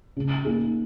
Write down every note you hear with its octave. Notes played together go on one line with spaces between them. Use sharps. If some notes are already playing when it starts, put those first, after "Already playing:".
C#3
A#3 D#4 G#4